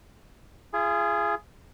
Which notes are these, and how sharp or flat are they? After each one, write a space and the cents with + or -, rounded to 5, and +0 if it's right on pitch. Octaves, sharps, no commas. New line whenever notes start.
F4 -40 G#4 +0